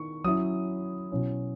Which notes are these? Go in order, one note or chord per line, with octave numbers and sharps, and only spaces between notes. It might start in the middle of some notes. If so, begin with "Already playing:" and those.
Already playing: D#3 E4 C#6
F#3 C#4 E4 D#6
B2 F#3 C#4 E4